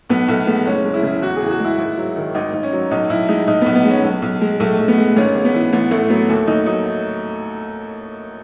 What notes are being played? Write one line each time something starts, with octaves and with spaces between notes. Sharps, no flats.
B1 B3
B1 A3
G#3 B3
F#1 C#4
G#3
E4
C#3
E2 F#4
G#4
E2
G#4
F#4
G#3 E4
G#1
F#3
D#3
G#1 D#4
G#1
C#4
F#3
B1 D#4
B1 E4
G#3 D#4
B1 D#4
B1 B3
B3
G#3 C#4
B1
B1
G#3
B1 A3
B1
B3
G#3
G#1 C#4
G#1
B3
E3
A1 B3
A1 A3
F#3 B3
D#2 A3
D#2 D#4
F#3 D#4